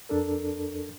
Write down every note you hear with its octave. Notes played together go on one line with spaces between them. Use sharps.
F2 D4 A4 A#4